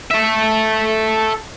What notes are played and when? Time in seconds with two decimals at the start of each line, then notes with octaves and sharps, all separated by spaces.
0.11 A4 E5